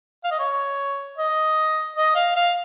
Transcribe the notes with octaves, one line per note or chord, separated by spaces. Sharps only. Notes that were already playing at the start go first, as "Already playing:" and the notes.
F5
D#5
C#5
D#5
D#5
F5
F5